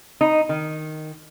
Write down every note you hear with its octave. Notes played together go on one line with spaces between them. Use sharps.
D#4
D#3